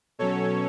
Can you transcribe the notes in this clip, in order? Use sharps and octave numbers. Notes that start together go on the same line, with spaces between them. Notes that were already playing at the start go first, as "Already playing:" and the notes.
B2 F#3 C#4 A4 C#5